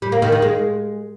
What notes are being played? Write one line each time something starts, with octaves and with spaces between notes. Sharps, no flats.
G3
A#3
D#3
D#3
G#3